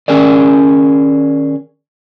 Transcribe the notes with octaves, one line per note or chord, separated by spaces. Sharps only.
D#3 C#4 G#4 A#4 D5